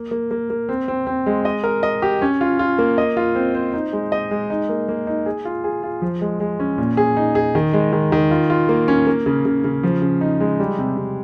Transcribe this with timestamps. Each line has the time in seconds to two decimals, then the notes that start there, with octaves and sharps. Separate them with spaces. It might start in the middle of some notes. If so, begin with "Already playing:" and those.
Already playing: A#3
0.11 A#3
0.31 A#3
0.50 A#3
0.69 C4
0.88 C4
1.07 C4
1.26 G#3
1.45 D#5
1.64 A#4
1.83 D#5
2.02 G4
2.22 C#4
2.41 F4
2.59 F4
2.78 A#3
2.98 D#5
3.17 F4
3.35 C4
3.55 C5
3.73 D#4
3.93 G#3
4.12 D#5
4.31 G#3
4.50 D#4
4.69 A#3
4.88 A#3
5.07 D#4
5.26 G#4
5.45 F4
5.64 G#4
5.83 F4
6.02 F3
6.21 G#3
6.40 G#3
6.60 C#4
6.78 A#2
6.97 G#4
7.17 D#4
7.35 G#4
7.55 D#3
7.73 G#3
7.92 D#3
8.12 D#3
8.31 F4
8.50 F4
8.69 A#3
8.88 C#4
9.07 A#3
9.26 C#3
9.45 C#3
9.64 C#3
9.83 F3
10.02 C#3
10.21 D#4
10.40 G#3
10.60 G3
10.79 C3
10.97 C3